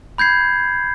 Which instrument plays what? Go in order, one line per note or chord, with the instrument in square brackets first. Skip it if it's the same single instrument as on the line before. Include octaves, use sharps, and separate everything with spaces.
[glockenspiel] B5 G6 G#6 C7